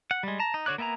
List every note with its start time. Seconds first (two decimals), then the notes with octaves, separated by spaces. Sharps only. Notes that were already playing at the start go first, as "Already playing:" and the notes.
0.11 F#5
0.23 G3 G#3
0.40 A5 A#5
0.54 D#4
0.66 D3 F#4 C#5 D6 F#6
0.78 A#3 B3 E5 G#5 A#5